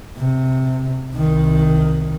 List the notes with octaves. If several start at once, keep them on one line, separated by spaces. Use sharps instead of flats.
C3
C2 D#3